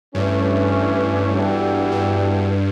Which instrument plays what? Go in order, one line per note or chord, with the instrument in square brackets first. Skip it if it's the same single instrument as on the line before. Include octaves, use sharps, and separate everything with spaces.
[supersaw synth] G2 [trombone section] E3 A3 C#4
[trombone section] E3 G3 B3 F#4 A4
[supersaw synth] G2